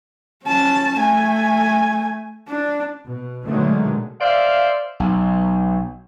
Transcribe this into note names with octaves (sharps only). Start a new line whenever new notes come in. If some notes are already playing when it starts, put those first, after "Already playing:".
C#4 A5
A3 G#5
D4
B2
B2 D3 D#3 F#3 G#3 A3
C5 D5 E5 F5
B1